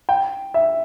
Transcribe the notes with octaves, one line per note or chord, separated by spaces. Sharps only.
G5
E5